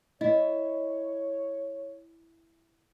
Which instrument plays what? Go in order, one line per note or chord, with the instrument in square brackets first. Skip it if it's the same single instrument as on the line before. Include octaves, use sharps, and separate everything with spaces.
[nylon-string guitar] E4 [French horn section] C#5 [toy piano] D#5